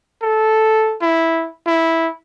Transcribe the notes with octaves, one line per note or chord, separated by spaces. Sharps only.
A4
E4
E4